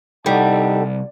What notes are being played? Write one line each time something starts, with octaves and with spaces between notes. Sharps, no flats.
C2 G3 D#4 A4 F#5 A5